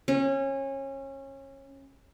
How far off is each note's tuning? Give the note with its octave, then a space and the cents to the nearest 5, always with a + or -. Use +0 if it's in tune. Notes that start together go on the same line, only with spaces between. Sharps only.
C#4 -25